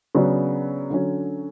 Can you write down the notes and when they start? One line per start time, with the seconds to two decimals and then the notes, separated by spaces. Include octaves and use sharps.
0.15 C#3 F#3 B3 D4
0.90 D3 F#3 C#4